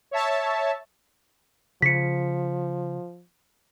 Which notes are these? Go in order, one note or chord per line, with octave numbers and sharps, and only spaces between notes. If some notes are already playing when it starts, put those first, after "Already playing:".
C#5 E5 A5
C#3 F3 B6 C#7